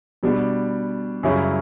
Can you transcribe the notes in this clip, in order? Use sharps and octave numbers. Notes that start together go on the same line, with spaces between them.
B2 G3 B3 D4
F#2 C#3 G3 C#4 E4